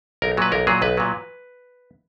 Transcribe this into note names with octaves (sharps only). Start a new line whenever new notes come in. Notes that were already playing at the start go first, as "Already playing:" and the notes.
B1 A#4
A#2 F#3 B4
B1 A#4
A#2 F#3 G#4
B1 B4
A#2 F#3